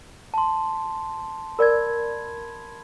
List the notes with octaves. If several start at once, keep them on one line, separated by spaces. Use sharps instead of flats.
A5 C6
A#4 D5 B5 G#6